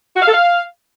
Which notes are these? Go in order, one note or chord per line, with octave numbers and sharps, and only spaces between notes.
F#4
F5
A4
F5